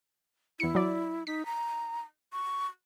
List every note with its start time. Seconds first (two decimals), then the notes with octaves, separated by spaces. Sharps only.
0.60 E2 E4 C#7
0.75 F#3 D5
1.27 D#4 B6
1.46 A#5
2.33 C#6